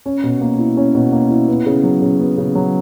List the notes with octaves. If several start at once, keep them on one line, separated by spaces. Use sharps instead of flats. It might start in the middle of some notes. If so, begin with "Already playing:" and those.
C#4
B2
A#3
E4
C#4
B2
A#3
E4
B3
C#3
F#3
C#3
B3
C#3
F#3